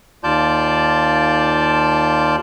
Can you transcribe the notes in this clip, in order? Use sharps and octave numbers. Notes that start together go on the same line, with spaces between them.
D#2 F4 D5 A5 G6